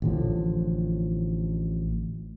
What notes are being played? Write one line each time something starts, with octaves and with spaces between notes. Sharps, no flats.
A1 A2 D3 F3